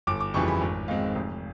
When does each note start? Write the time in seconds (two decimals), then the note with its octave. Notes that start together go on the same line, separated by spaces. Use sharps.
0.07 G1 D6
0.20 D6
0.34 F2 C#3 E3 G3 C#6
0.48 B5
0.61 G#1
0.88 G#2 D#3 G#3 C4 F5
1.15 F1